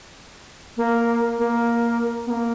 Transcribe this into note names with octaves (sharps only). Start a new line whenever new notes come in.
A#3
A#3
B3
A#3